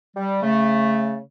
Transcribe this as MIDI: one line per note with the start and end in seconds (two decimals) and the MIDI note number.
0.17 0.39 55
0.42 1.19 49
0.42 1.19 57